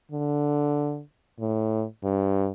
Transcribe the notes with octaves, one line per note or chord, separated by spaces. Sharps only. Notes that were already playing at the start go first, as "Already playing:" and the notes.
D3
A2
G2